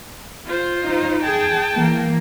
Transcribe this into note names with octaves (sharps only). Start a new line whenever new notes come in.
F4 C5
D#4
G#4 G5 A5
E3 A#3